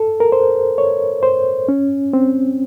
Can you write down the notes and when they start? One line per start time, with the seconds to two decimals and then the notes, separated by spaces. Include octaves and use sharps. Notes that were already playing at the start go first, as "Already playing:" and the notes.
Already playing: A4
0.20 A#4
0.32 C5
0.78 C#5
1.23 C5
1.68 C#4
2.13 C4